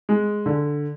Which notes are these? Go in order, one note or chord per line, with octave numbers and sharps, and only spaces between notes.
G#3
D3